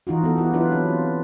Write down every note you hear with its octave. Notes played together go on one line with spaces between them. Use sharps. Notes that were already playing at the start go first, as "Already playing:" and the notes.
E3 D#4 F4 F#4
B3 F#4 A4
E4 G4
F#3 D4 E4 F4 B4
C4